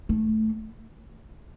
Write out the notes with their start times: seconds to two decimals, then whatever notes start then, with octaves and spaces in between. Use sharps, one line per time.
0.09 A3